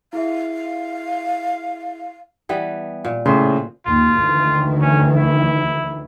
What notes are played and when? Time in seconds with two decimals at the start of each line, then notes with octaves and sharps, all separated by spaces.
0.13 E4 G#4 E5 F5
2.49 E3 G3 B3
3.05 A#2
3.26 A2 C#3 C5
3.86 D#2 F4
4.15 D2 D#3 E3
4.81 C#4
5.15 E4